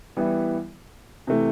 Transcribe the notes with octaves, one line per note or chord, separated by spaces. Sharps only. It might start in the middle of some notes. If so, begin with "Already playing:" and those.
E3 G3 B3 E4
C3 E3 A3